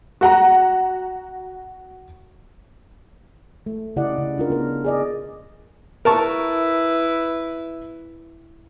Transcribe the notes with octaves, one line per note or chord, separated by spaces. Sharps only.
F#4 F#5 A#5
A3
C#3 E4 G4 D5 D#5 F#5
C#3
D4 F4 A#4
B3 A#4
G#4 D5 D#5
E4 A#4 B4 A5 C#6